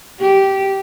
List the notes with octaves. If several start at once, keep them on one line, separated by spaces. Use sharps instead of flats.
G4